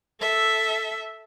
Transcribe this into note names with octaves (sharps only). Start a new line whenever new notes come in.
A4 E5